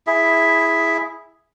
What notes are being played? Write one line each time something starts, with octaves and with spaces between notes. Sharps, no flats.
E4 G#4 E5